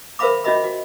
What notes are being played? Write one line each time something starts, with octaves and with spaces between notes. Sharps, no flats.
A#4 C5 E5 F5 B5 D6
C#4 F4 F#4 D#5 E5 B5
F#4